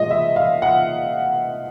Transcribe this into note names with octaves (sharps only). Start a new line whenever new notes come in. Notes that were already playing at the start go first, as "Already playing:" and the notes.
Already playing: A#2 F3 G#3 D#5
E5
F5
F#5